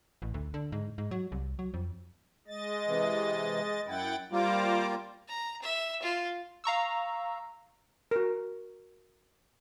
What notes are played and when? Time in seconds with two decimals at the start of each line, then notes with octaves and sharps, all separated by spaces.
0.22 A1
0.34 D2
0.54 D3
0.72 G#2
0.98 G#2
1.11 F#3
1.32 C2
1.59 F#3
1.74 F2
2.47 G#3 D#5 A6
2.88 C3 E3
3.87 F#2 E4 F#5 G5 A6
4.32 G3 A#3 F4 C5 A#5 D6
5.28 A#5
5.62 E5
6.02 F4
6.64 F5 A#5 C#6 E6
8.11 F#4 A#4